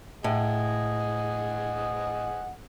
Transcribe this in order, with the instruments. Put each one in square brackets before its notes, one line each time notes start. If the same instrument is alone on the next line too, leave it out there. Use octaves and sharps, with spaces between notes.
[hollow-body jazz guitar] A2 [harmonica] G#4 D#5 F#5